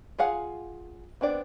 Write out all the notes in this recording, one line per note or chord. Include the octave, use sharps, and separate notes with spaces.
F4 G#4 F5 F#5
B3 C4 D4 D5